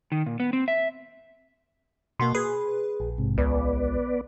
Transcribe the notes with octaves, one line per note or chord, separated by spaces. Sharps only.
D#3
A#2
B3
C4
E5
B2 A#3 F#4 C6
G#4 B4
A#1
G#2 C3
C#2 B3 B4 D5